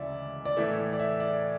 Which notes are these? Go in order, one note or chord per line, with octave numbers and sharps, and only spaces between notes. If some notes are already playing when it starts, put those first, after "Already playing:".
Already playing: D2 C#3 E3 G#3 D5 E5
D5
A2 E3 A3 E5
D5
E5
D5